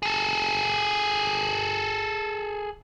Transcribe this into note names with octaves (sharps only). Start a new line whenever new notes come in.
G#4 A4